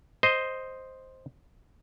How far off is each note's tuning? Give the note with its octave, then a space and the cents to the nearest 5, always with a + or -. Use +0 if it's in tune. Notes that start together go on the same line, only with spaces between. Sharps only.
C5 +0 D#5 +0